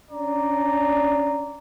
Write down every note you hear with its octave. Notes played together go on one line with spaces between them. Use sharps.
C#4 D4 D5 A#5